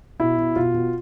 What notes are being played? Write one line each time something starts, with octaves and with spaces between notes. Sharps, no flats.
B2 E4
B2
B2 F4
B2